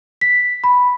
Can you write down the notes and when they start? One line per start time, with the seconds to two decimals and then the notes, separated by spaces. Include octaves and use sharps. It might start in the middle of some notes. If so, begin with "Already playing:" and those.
0.21 B6
0.64 B5